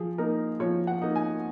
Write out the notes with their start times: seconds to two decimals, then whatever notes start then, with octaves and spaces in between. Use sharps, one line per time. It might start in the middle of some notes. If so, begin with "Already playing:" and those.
Already playing: F3 G#4
0.18 A#3 D#4 A#4
0.60 F3 C#5
0.87 F#5
1.02 A#3 D#4
1.16 G#5